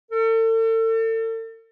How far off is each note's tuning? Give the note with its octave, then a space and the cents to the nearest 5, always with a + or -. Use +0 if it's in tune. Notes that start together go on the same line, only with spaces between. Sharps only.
A4 +40